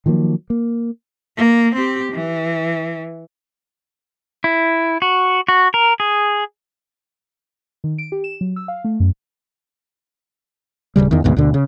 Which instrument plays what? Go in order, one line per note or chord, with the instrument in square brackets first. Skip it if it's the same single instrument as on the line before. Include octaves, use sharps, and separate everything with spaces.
[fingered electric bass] D#3 F3 F#3 A#3
A#3
[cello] A#3
C4 G4
E3
[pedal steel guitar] E4
F#4
F#4
A#4
G#4
[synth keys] D#3
D7
G4
E7
F#3
E6
F5
A3
F#2
[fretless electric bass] D1 C2 C#3 G3
E2 D#3
D2 G#2 B2
D2 B2 D3
C#3